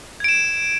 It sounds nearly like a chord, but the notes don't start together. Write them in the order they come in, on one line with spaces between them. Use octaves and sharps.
G#6 D7 E7